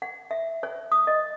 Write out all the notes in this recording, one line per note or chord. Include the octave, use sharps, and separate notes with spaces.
F#5
E5
C#5
D#6
D#5